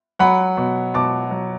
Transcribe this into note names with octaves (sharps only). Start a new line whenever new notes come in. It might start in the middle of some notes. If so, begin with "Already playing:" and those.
F#3 F#5 B5
B2
B2 A5 D6
F#3